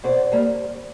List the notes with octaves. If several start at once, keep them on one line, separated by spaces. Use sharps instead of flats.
B2 C5 D5
G3 A#3